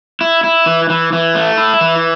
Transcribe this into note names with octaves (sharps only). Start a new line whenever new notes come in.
E4
E4
E3
E3
E3
A3
E4
E3